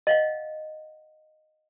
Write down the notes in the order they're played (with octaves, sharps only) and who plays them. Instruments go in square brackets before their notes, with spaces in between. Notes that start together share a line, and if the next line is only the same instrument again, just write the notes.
[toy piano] D#5 F5 F#5